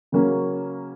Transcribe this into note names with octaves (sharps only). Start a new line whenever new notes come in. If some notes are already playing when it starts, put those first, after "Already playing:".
C#3 F#3 A#3 C#4